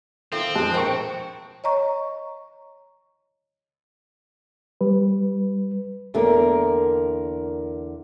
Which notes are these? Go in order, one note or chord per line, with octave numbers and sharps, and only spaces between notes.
D#3 C4 F4 A4 E5
F2 E3 G#3 D4 A5
D#2 B2 A#4 C5 G5 C#6
C#5 D#5 A#5 C#6
G3 B4
E2 D3 A#3 A#4